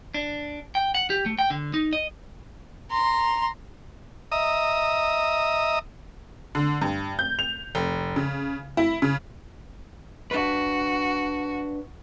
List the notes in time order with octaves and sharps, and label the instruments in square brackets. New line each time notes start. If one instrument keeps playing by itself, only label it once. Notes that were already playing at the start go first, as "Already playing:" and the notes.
[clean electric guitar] D4
G5
F#5
G4
A3
G5
D3
D#4
D#5
[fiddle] A#5 C6
[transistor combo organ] D#5 E5 A#5 D#6
[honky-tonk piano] D3
G2
G6
F7
F1
C#3
E4
C#3
[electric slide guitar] D4 B4 [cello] F#4